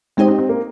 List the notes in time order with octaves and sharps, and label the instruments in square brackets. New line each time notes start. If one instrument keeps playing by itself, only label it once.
[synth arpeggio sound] G#3 D#4 G4 C5 D#5 [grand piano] C4
[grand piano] C4
C4
A#3